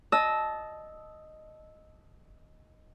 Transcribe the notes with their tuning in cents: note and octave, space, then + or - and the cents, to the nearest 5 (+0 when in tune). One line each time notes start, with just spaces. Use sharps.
D#5 +0 A5 -15 E6 -15